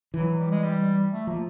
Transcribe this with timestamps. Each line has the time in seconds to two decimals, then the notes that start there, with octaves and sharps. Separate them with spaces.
0.14 E3 F#3
0.38 G3
0.51 G#3
0.64 G3
1.12 A3
1.27 F3 A#3